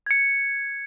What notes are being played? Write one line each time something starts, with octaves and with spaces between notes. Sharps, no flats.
G#6 C#7